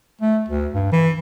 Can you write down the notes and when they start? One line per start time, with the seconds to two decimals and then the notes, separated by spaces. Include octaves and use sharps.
0.21 A3
0.48 D2
0.74 G2
0.92 E3